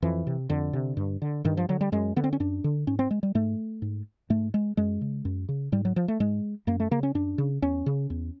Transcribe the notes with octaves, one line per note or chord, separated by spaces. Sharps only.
F2 E3
C3
F2 D3
C3
G2
D3
G2 D#3
F3
D3 F#3
G3
F#2 G#3
D3 B3
C4
C#4
F#2 D4
D3
G#2 C#4
C4
G#3
G3
G#2 A3
G#2
G#2 A3
G#3
F#2 G#3
C#3
F#2
C#3
G#2 G3
F#3
F3
A3
G#2 G#3
F#2 A#3
A3
C#3 A#3
C#4
F#2 D4
C#3
E2 C#4
C#3
E2